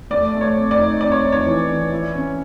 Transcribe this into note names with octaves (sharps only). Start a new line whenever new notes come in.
A3 D5
A3
C#5
C4
D5
D#4
C4 D5
C#5
D#4
C#5
E3
E3
E4
C#4